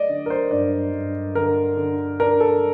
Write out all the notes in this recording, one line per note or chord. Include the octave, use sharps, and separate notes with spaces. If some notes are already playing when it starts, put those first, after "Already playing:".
Already playing: A3 D5 D#5
D3
A#4
C5
G2 D5
G2
D3 A#4
D3
D4 A#4
A4